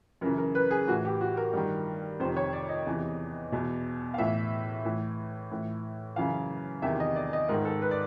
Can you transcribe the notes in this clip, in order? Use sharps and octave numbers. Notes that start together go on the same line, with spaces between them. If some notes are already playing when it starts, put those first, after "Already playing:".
F#2 C#3 E3 A#4
A#4
B4
G#4
A2 E3 F#4
G4
F#4
A#4
G2 D#3
F2 C3 D#3 C5
C#5
D5
D#5
E2 C3 E3
E2 B2
F5
A2 E3 E5
A2 E3
A2 E3
F#2 C#3 E3 F5
E2 C3 D#3 E5
D#5
D5
D#5
G#2 D#3 A#4
A4
B4
D5